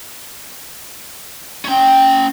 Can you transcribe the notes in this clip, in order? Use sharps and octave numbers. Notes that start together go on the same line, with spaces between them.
C#4 G5